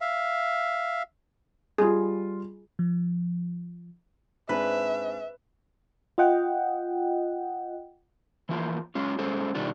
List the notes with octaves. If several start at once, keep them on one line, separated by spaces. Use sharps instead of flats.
E5 F5
G3 F4 G#4
F3
G#2 C4 D4 B4 E5
F4 D#5 F#5 G5
E3 F3 A#3 F4
F#3 G#3 C#4 F4
G#3 C#4 G#4 A4 C5
B2 D#3 G3 D4 F4